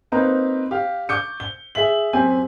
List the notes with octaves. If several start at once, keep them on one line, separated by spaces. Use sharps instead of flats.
A#3 C4 D#4 B4 A#5
G4 F5
C#6 D6 G6 C#7
G7
G#4 E5 B6 F#7
F#2 C4 G4 G#5